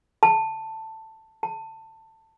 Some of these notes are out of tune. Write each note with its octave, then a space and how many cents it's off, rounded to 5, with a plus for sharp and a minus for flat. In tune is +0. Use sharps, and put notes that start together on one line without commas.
A5 +10
A5 +20